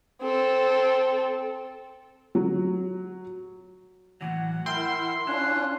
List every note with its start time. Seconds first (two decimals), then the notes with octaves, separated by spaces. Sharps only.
0.22 C4 A4
2.35 F#3
4.21 A2 E3 F#3 F#5
4.66 E4 A#4 G5 C6 E6
5.27 C#4 D4 E4 F4 F#6